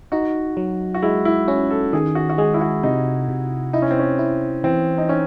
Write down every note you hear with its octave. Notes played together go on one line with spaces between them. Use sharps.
D#4 F#4
F#3
F#4
G#3 E4
E4
C#4 F#4
A4
D#3 G#4
F#4
F#4
G#3 G#4
E4
F#4
C3 D#4
C3
D#4 E4
C#4
C4
C#4
E4
E3 C4
D#4
C#4 D#4